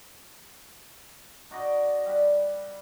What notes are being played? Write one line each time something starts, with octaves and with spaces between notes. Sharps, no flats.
D#4 F#4 D5 D#5
G3 B4